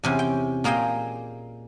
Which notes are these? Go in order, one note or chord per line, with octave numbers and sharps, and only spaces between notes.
E2 C3 C#4
G5
A#2 A#3 G#4 D#5 G5